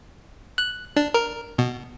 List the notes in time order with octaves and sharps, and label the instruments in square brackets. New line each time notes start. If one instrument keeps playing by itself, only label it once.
[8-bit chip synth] F#6
D4
A#4
B2